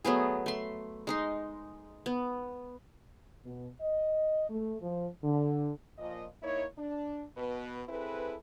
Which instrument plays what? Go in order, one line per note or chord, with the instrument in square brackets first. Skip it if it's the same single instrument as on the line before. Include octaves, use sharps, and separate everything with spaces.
[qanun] F#3 A3 B3 G#4
A3 C6
G#3 D#4 C6
B3
[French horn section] B2
D#5
A3
F3
D3
A#2 F3 D#5
A#3 D#4 E4 C#5
D4
B2 B3 B4
C4 E4 G#4 A4 B4